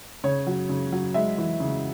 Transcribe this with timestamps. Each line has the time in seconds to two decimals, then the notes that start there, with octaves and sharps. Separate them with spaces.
0.24 C#3 C#5
0.47 F#3
0.69 C#3
0.92 F#3
1.14 G#3 E5
1.38 E3
1.60 C#3